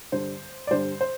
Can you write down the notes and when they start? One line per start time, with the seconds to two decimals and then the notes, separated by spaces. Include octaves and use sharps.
0.12 G2 D3 G3 C5
0.67 D5
0.71 G2 D3 G3 C5
1.01 C5